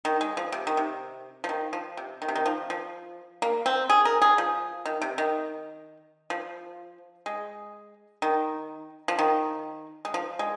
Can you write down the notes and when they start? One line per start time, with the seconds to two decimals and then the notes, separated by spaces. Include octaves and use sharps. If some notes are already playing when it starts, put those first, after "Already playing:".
0.05 D#3
0.21 G#3
0.37 F3
0.52 C3
0.67 D#3
0.77 C3
1.44 F3
1.49 D#3
1.73 F3
1.97 C3
2.22 D#3
2.28 C3
2.35 D#3
2.46 F3
2.70 F3
3.42 A#3
3.66 C4
3.90 G#4
4.05 A#4
4.22 G#4
4.38 F3
4.86 D#3
5.02 C3
5.18 D#3
6.30 F3
7.26 G#3
8.22 D#3
9.08 F3
9.19 D#3
10.05 G#3
10.14 F3
10.39 G#3